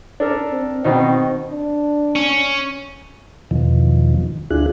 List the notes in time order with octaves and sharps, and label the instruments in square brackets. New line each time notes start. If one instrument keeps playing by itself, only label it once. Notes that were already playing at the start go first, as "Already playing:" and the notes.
[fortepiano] D4 A4 A#4
[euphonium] C4
[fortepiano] B2 D#3 D#4 [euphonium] C4
[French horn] D4
[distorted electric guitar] C#4
[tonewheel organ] E2 B2 D#3 F3
D2 D4 E4 F4 G#4 F#6